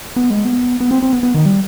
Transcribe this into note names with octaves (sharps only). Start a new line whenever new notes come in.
B3
G#3
B3
B3
C4
C4
B3
B3
D#3
G3